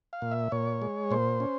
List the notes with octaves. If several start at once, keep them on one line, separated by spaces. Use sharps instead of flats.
F5
A#2
E5
A#2 C#5
G#3
A#2 C5
C#4